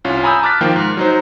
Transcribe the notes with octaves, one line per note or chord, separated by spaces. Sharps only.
C2 C#4 F4
G#5 A#5 B5 D#6 E6 G6
A5 D6 F6 F#6 A6 B6
D#3 F3 A#3 F4 G5
G#2
F#3 D#4 C5